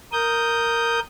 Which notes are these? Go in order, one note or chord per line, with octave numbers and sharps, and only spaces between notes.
A#4 D#6 G6